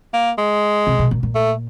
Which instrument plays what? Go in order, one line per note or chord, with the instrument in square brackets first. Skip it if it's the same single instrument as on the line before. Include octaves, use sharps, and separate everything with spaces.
[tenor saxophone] A#3
G#3
[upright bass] C3
B2
A#2
A#2
[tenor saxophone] A3